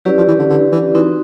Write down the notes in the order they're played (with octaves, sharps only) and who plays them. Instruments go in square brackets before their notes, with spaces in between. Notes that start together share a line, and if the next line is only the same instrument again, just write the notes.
[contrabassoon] F#3 [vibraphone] C#4 E4 G4 B4 D5
[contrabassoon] F3
E3
D3
D3
E3
[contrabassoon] E3 [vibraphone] C4 D#4 F#4